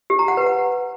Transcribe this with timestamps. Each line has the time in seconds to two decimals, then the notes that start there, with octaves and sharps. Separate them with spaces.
0.10 G4
0.19 A#5
0.28 F#5
0.37 B4
0.46 F#5